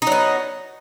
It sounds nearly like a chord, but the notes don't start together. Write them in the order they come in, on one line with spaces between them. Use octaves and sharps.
D#4 F#3 B3